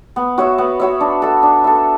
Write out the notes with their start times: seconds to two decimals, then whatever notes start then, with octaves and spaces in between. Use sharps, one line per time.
0.16 B3
0.38 F#4 C#5 E5
0.58 B3
0.80 F#4 C#5 E5
1.00 D4
1.22 A4 E5
1.43 D4
1.64 A4 E5